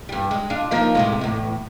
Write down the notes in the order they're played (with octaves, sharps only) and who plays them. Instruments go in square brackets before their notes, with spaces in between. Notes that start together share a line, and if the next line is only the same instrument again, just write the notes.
[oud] G2 G3
G#3
D4 F4
F3 A#3 D#4
A2 C3 G#3
E2 A2